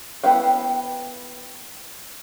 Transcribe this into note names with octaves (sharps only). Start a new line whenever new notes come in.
B3 E4 F5 G5